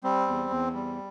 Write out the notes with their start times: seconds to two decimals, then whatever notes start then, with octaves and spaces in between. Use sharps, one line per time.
0.04 G3 C4
0.27 E2
0.51 E2
0.73 G3